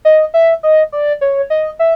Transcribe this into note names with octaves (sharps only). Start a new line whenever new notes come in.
D#5
E5
D#5
D5
C#5
D#5
E5